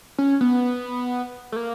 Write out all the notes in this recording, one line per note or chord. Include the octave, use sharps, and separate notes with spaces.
C#4
B3
A3
A#3